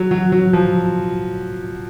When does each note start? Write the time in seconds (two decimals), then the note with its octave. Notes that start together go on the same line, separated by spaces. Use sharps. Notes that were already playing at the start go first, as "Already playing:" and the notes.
Already playing: F#3
0.11 F#3
0.32 F#3
0.53 F3